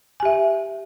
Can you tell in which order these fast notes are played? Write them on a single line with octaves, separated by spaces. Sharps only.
G#5 G4 E5